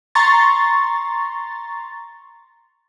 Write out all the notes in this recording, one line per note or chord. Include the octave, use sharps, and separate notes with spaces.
A#5 C6 C#6 A6